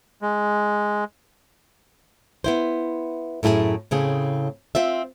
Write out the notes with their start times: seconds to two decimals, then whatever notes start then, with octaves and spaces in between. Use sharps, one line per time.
0.22 G#3
2.44 B3 E4 C5
3.43 F#2 A2 E4 G4 G#4
3.91 A2 C#3 C4 G#4
4.75 C4 F4 E5